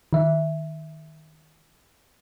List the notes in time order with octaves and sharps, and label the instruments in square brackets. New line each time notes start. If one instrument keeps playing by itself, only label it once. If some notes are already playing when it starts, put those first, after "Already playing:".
[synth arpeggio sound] D#3 E5